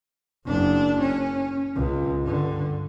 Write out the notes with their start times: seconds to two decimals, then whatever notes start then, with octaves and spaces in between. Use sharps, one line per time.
0.46 F#1 D4
1.01 C#4
1.76 C#2
2.22 G2 D3